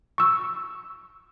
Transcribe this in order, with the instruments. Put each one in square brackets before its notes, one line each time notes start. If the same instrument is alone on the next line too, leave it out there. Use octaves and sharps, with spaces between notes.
[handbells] C#6 E6